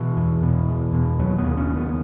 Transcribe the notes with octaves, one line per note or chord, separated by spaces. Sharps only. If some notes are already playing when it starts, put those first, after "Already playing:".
Already playing: B2 E3
E2
B2
E2
B2
D#2 F#3
B3
C#3
C#4
D#2
B3